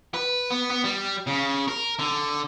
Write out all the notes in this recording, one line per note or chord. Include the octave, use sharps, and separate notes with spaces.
B4
B3
B3
G3
C#3
A#4
D3